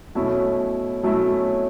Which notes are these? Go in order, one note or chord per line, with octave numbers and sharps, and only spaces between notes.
B2 F#3 A3 C#4 E4
B2 F#3 A3 C#4 E4